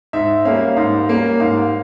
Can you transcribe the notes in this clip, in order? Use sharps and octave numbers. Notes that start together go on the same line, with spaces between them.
G#2 E5
G3 A#3 C#4 F5
G#2 F5
G3 A#3 C#4
G#2 F5